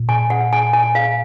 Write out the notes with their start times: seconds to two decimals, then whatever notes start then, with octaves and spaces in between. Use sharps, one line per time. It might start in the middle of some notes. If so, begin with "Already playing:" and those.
Already playing: A#2
0.09 G#5
0.30 F#5
0.53 G#5
0.73 G#5
0.95 F5